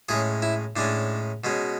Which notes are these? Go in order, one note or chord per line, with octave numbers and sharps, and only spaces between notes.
A2 G#3 C#4 G#4
E4
A2 G#3 C#4 D4
B2 G#3 C#4